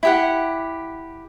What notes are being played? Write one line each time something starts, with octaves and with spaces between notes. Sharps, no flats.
E4 G4 F#5